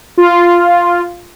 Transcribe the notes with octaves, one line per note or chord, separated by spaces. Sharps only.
F4